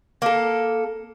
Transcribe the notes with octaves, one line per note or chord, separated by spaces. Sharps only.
A#3 A4